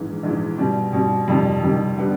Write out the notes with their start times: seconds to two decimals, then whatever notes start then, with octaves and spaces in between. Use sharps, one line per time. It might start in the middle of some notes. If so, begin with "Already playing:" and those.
Already playing: A#1 G#2 E3
0.23 A#1 G#2 E3
0.58 B2 G3 C4
0.93 B2 G3 C4
1.28 F2 C3 D#3 G3 C4
1.62 F2 C3 D#3 G3 C4
1.98 D3 G3 B3